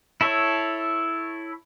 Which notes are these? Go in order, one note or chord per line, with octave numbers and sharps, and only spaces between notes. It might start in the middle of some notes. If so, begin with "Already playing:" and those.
E4 A4 C#5